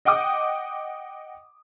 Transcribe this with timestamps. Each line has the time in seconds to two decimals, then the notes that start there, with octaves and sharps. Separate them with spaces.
0.05 D#5 F#5 G5 D6 D#6